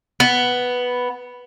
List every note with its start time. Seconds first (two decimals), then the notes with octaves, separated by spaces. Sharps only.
0.20 B3